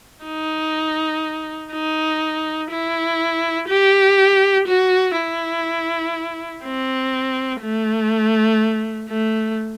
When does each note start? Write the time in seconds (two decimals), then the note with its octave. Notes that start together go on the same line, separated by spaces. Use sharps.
0.25 D#4
1.72 D#4
2.71 E4
3.69 G4
4.68 F#4
5.16 E4
6.64 C4
7.62 A3
9.09 A3